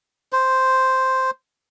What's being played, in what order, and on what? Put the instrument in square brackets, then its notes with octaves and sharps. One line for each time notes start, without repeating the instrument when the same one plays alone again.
[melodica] C5